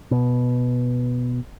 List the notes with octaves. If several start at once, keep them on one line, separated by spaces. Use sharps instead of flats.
B2